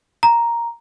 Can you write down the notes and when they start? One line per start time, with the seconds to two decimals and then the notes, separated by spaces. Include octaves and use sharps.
0.23 A#5